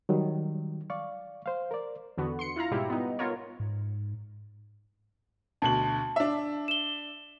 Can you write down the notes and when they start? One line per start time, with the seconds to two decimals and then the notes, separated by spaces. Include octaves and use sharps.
0.09 D#3 F#3 G3
0.90 D5 F5 C#6
1.46 C5 F5
1.71 A#4 D5
2.18 E2 D3 B3 F#4
2.39 C6 C#7
2.56 E4 F4 F5 A#5
2.71 G#2 B2 G3 E4 F4 G4
2.90 B3 D#4
3.19 B3 F4 A#4 C#5
3.60 G#2
5.62 D2 B2 A5 F#7
6.16 D4 E5
6.68 E7 G7